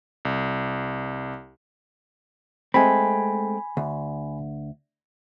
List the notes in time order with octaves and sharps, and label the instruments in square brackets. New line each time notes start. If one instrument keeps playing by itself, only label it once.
[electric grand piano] C2
[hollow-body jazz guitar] G#3 A3 C4 [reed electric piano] G#5 B5
[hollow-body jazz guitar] D2